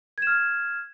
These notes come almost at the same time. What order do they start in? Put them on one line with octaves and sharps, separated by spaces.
G#6 E7 F6